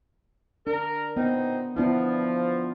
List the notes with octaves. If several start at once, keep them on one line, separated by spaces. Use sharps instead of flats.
D4 A#4
A#2 B3 C4 D#4
F3 B3 D4 E4